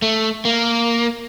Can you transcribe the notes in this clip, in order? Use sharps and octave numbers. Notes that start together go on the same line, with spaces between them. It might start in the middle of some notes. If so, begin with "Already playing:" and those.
A3
A#3